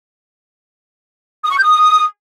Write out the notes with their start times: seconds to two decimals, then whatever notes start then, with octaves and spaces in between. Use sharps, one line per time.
1.43 D#6
1.50 C#6
1.57 G6
1.64 D#6